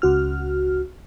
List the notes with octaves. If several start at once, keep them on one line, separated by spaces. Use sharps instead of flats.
C#2 F#4 F6